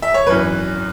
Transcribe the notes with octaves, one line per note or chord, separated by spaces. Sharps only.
E5
C#5
G#1 F#2 E3 B4